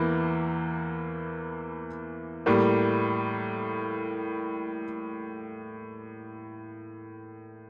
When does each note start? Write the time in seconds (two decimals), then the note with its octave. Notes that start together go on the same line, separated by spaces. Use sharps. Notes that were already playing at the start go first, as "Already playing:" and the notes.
Already playing: E2 E3 A#3 E4
2.46 A2 G3 A#3